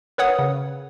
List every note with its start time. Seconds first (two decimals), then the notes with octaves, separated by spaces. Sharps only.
0.18 A#4 B4 C#5 F#5 D#6
0.39 C#3